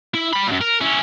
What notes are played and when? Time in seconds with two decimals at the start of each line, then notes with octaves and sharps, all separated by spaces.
0.14 E4
0.33 G3 B5
0.47 F#2 A#2
0.61 A#4
0.81 C#4 E4